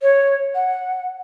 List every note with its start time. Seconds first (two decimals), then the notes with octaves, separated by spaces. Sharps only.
0.02 C#5
0.55 F#5